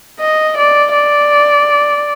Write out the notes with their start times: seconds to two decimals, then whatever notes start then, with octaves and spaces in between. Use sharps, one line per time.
0.20 D#5
0.58 D5
0.95 D5